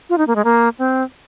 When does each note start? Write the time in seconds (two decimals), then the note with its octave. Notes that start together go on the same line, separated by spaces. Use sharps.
0.10 F4
0.18 D#4
0.27 A#3
0.36 G#3
0.45 A#3
0.79 C4